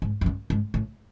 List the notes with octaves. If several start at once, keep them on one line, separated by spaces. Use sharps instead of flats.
G#2
F#2
G2
G#2
A2